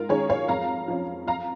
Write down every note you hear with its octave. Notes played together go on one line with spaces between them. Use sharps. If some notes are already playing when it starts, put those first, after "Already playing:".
Already playing: G#2 F4 A#4
D#3 C#4 G#4 C#5
C#5 F5
F2 F5 A#5
F3 C#4
F2 F5 A#5